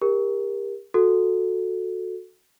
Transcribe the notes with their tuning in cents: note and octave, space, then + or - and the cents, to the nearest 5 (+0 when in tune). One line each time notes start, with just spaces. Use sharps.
G4 +30 A#4 +15
F#4 -15 A4 +0